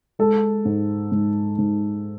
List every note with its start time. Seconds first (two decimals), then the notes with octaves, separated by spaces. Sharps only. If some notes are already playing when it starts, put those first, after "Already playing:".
0.19 G#3 A4
0.65 G#2
1.12 G#2
1.58 G#2